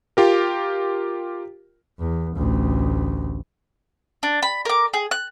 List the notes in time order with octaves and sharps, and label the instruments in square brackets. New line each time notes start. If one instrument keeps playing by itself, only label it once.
[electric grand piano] F4 G4 A#4
[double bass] E2
A1 D2
[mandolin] D4
B5
A#4 D6
G#4
F#6